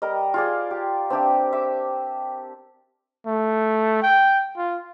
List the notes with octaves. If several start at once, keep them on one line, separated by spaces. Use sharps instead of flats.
G3 A#4 D#5
F4 G#4 D5
G4
C4 D4 G4 E5
E5 D6
A3
G5
F4